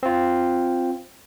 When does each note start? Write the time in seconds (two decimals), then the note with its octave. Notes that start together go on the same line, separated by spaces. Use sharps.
0.03 C4 F4